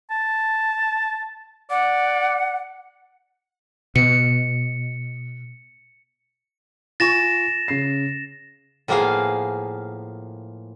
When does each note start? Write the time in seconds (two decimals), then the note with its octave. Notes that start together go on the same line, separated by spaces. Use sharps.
0.11 A5
1.70 D5 F#5
3.96 B2 C#7
7.00 F4 G#5 C#6 A6 A#6 E7
7.68 C#3 C7
8.88 A2 F3 A#3 B3 G#4 F5